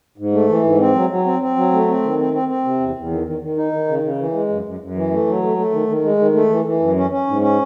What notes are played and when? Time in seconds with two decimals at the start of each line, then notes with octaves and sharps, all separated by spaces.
0.18 G#2
0.33 A3
0.49 E3
0.64 G#2
0.80 C4
0.95 F#3
1.10 F#3
1.25 C4
1.42 C4
1.56 F#3
1.72 A3
1.88 C4
2.03 D#3
2.19 C4
2.33 C4
2.48 C4
2.65 C3
2.80 E2
2.96 E2
3.11 D#3
3.25 D#3
3.41 D#3
3.57 D#4
3.72 D#3
3.88 C#3
4.03 C#3
4.18 E3
4.33 G#3
4.49 F#2
4.65 F#2
4.80 F#2
4.95 E3
5.11 A3
5.27 F#3
5.42 A3
5.57 A3
5.72 D#3
5.88 D#3
6.03 G#3
6.19 D#3
6.34 A3
6.50 E3
6.65 E3
6.80 F#2
6.96 C#4
7.10 C#4
7.27 G#2
7.41 C#4